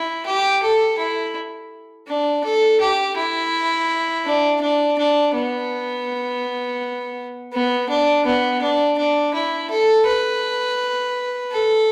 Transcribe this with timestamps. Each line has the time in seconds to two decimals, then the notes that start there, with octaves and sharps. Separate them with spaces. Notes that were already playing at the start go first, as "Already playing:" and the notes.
Already playing: E4
0.26 G4
0.62 A4
0.98 E4
2.08 D4
2.44 A4
2.80 G4
3.17 E4
4.26 D4
4.61 D4
4.98 D4
5.34 B3
7.52 B3
7.89 D4
8.25 B3
8.62 D4
8.98 D4
9.34 E4
9.70 A4
10.06 B4
11.52 A4